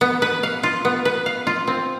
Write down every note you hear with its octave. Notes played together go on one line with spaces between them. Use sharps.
B3
B4
F5
F4
B3
B4
F5
F4
C4